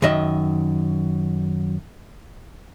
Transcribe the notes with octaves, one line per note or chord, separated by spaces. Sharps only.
F#2 D#3 D#5 E5